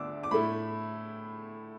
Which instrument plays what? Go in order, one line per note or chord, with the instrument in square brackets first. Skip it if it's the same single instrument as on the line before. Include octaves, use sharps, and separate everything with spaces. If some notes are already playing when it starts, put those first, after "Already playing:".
Already playing: [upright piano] D2 D3 D4 D6 E6
D6
A2 A3 E4 B5